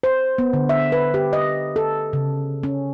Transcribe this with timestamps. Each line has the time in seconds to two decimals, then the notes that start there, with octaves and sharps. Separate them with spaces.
0.03 C5
0.38 B3
0.53 D3
0.69 E5
0.92 B4
1.14 G4
1.33 D#5
1.76 A4
2.13 C#3
2.63 C#4